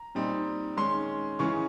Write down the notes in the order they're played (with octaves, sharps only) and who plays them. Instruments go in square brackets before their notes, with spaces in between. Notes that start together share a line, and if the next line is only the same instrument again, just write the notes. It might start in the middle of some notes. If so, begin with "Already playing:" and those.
Already playing: [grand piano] A#5
A#2 G3 C4 D#4
D#3 G#3 C#4 C6
C#3 E3 G#3 C#4 C#6